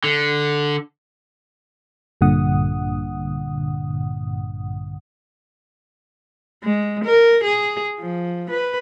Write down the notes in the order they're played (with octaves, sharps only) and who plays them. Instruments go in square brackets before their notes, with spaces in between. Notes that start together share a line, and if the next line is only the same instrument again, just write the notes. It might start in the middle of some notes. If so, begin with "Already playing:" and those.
[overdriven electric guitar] D3
[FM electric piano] A#1 G2 A#2 D3 F#5 D#6
[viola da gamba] G#3
A#4
G#4
F3
B4